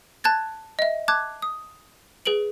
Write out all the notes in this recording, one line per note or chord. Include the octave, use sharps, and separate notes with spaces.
A5 F#6 G#6 A6
D#5 E5
A5 D6 F#6 G#6
D#6
G#4 B4 D7 F#7